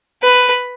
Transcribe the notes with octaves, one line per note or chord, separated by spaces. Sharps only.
B4